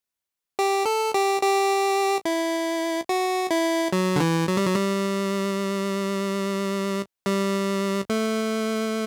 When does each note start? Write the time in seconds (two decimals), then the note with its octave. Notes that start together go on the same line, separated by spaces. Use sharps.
0.59 G4
0.85 A4
1.14 G4
1.42 G4
2.25 E4
3.09 F#4
3.51 E4
3.93 F#3
4.16 D3
4.20 E3
4.48 F#3
4.57 G3
4.66 F#3
4.76 G3
7.26 G3
8.10 A3